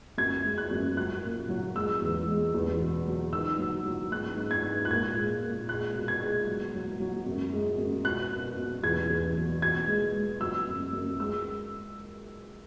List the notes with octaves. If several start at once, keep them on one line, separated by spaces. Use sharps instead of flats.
F#2 G#6
G#3
F#6
F#2
F#3 F#6
A#2
F#3
G#3 E6
E2
G#3
E2
B2
F#3
D#3 E6
F#3
F#3
G#2 F#6
G#2
G#6
G#2
F#6
A#2 G#6
G#3
A#2
G#3 F#6
B2
G#6
G#3
F#3
F#3
F#3
F#2
G#3
F#2
B2 F#6
B2
B2
E2 G#6
E2
F#3
B2 G#6
G#3
G#3
F#3 E6
F#2
F#2
G#3 E6